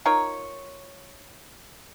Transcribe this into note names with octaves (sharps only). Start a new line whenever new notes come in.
D#4 F4 A#4 C#5